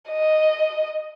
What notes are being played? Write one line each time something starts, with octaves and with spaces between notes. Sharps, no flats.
D#5